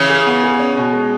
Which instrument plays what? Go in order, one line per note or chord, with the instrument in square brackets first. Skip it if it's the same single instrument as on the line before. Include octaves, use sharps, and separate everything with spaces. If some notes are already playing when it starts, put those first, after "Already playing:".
Already playing: [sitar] C#3 E3 [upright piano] C#4
[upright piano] G#4
B3
G#4
C#4
B2
G#3